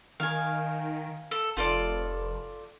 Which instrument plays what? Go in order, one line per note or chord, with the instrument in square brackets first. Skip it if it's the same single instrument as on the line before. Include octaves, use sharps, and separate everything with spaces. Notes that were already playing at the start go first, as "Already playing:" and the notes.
[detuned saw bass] D#3 [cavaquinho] F5 G#5
[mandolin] A4
[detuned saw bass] F1 [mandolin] F4 A4 D5